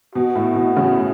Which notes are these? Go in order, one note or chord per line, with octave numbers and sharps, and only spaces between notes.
B2 F#4
A2
B2
A2 C#3
A2